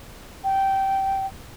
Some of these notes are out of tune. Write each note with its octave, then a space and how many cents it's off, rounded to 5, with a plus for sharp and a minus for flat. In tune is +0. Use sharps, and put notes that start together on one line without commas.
G5 -15